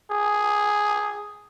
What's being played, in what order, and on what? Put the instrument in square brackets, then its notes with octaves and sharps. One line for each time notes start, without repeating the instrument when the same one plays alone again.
[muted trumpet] G#4